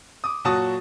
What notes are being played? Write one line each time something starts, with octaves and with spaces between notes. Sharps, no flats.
D6 D#6
A#2 F#3 F#4 A5 D#6 A6